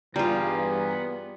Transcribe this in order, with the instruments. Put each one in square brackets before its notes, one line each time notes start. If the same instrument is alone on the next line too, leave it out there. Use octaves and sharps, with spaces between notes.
[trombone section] G2 E3 G#4 [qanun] G3 F4 [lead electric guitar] B3 A#5